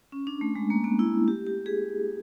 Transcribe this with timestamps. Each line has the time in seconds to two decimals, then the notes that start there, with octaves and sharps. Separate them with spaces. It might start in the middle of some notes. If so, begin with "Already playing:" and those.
0.12 C#4
0.27 D4
0.41 A3
0.55 G#3
0.70 A#3
0.84 B3
0.99 E4
1.28 G4
1.47 G4
1.66 G#4